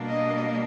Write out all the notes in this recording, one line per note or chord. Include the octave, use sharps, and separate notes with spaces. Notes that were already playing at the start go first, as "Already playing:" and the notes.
Already playing: B2 G3 A#3 D4
D#5